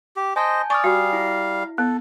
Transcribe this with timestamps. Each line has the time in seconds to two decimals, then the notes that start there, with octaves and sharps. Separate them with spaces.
0.16 G4
0.36 C5 D#5 G#5 A5 G6
0.70 D5 G#5 C#6 D#6 F6
0.84 G3 F#4 F5
1.13 E4
1.78 B3 A4